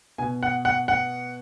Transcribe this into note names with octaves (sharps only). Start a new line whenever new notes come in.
B2 G#5
F#5
F#5
F#5